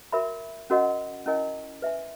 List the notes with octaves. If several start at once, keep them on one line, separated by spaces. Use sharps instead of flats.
F#4 A#4 E5 B5
C#4 F#4 A#4 D#5 F#5
C#4 E4 A#4 D#5 G#5
B4 E5 G#5